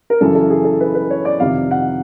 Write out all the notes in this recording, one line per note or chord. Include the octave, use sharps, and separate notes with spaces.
A#4
F#2 C#3 E3 A4
A4
G#4
A4
B4
B4
C#5
D5
F2 C3 D#3 F5
F#5